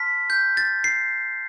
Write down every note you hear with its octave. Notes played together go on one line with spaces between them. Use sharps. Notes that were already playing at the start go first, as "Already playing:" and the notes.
Already playing: A5 C6 F6 B6
G6
A6
C7